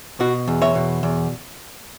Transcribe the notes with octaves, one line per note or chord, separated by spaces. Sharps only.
B2 F#4
E2
C#5 E5
B2
E2